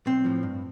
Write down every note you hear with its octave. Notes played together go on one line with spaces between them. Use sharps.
B1 C4
A2 F3
G2